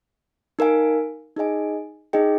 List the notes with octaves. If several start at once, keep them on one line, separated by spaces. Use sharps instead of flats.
D#4 A#4 F5 G#5
D#4 G#4 D#5 G#5
D#4 G#4 D#5 G5